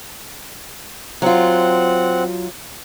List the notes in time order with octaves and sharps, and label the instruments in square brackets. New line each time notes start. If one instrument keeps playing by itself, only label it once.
[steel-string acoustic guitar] F#3 F4 [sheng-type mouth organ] C4 F#5